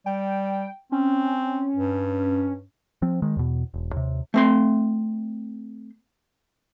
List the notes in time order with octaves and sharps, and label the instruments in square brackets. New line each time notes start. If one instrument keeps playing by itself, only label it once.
[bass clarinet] G3 [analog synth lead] G5
[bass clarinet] C4 [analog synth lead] C#4
[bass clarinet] G2
[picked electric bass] F3 C4
D#3 G#3
E2 B2
E1
D#2 C3
[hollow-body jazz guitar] A3 C4 C6